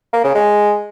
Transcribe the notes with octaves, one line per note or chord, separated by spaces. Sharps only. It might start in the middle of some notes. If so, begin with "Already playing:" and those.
A#3
C#3
G#3